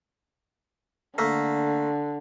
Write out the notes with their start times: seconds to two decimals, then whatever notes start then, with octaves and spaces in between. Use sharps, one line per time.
1.18 D3 A3 A#3